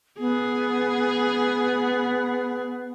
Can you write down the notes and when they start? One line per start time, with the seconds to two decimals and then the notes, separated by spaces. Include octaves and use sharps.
0.19 B3 G#4